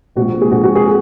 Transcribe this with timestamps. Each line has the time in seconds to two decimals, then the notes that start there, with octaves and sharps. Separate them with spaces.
0.16 A#1 A#2 G#3 C4 F#4
0.41 G#4
0.51 A#1 A#2 G#3 C4 F#4
0.63 F#4
0.75 G#4